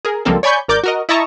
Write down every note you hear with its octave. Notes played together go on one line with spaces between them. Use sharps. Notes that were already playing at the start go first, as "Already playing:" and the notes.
G#4 A#4
C#2 F3 G3 A#3 C4 A4
C#5 D5 G#5 B5 C#6 G6
G#1 A#4 D5 D6 G6
F#4 A#4 D#5
E4 D#5 E5 A5 A#5 C#6